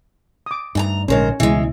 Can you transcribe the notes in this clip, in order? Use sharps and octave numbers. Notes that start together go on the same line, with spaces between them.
D6 D#6
D2 G2 D#4 G#5 A#5
A#1 G#2 D3 C#4 A#4 C5 C#5
C#2 B2 E3 G#3